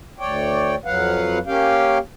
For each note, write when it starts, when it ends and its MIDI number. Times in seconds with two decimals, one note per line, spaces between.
0.19 0.75 38
0.19 0.75 73
0.19 0.75 74
0.19 0.75 79
0.85 1.39 41
0.85 1.39 54
0.85 1.39 71
0.85 1.39 77
0.85 1.39 78
1.46 1.98 58
1.46 1.98 61
1.46 1.98 67
1.46 1.98 77
1.46 1.98 79